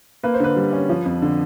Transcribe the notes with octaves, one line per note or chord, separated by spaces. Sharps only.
A#3 B4
C5
D3 B4
G3
C#4
F3
F2
D3